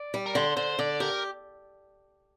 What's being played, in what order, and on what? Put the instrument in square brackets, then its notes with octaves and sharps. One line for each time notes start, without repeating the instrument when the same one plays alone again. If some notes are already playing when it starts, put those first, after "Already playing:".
Already playing: [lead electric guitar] D5
[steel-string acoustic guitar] G3
[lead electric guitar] A#4
[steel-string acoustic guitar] D3 [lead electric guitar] C5
[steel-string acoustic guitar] D3 [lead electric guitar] C5
[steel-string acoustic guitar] D3 [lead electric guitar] D5
[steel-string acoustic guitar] G4 [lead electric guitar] A#4